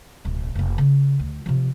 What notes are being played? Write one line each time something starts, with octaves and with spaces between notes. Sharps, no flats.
D1 B1
F1 A#3
C#3
D2
C3 F3